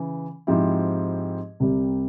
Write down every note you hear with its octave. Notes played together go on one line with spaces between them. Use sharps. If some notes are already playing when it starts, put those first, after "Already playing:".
Already playing: C#3 E3
G#2 F3 C4 E4 G4
C2 C3 G3